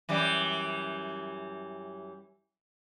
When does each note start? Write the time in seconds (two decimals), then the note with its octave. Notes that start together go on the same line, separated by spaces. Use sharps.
0.09 F#2 E3 G3